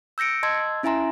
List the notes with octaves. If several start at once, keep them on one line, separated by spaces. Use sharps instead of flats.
E6 G6 A#6 C#7 D7
D#5 A5 C6 E6 G#6
C#4 E4 E5 G#5 A#5 C6